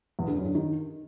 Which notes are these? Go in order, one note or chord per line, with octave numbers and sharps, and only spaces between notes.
E2
D3
F#2
D3
D#3